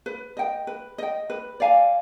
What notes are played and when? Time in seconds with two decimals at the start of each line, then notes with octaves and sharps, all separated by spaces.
0.06 B4
0.37 D#5 G5
0.67 B4
0.98 D#5 G5
1.30 B4
1.60 D5 F5 G#5